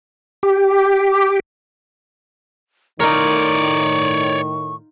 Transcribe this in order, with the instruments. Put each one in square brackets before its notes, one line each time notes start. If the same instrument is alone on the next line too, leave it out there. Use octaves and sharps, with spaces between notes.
[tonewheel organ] G4
[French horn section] A2 D#3 [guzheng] D#4 F4 A#4 [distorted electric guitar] C#5 D5 [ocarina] C#6